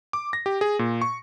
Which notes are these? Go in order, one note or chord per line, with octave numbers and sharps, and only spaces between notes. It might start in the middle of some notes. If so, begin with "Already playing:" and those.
D6
A#6
G4
G#4
A#2
C#6